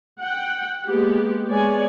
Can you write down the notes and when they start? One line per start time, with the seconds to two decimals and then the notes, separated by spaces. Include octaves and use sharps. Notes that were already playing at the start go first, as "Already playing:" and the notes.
0.20 F#5 G5
0.85 G#3 A#3 B3 G4
1.48 G#3 B3 C#5 D5 G#5